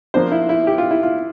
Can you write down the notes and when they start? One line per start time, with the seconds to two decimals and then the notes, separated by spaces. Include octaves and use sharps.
0.14 F3 A#3 D4 C5
0.32 E4
0.49 E4
0.67 G4
0.78 F4
0.91 E4
1.03 F4